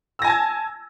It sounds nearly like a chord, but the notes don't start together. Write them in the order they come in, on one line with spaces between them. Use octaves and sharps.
E6 A#6 G#5 A5 G#6